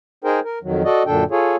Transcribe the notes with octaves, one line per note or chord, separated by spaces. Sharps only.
D#4 G#4 A#4 C5 G5
A#4
F2 D#3 F#3
F#4 A4 D5 D#5
F#2 A#2 D3 D4 A4 G5
F4 G#4 A4 C#5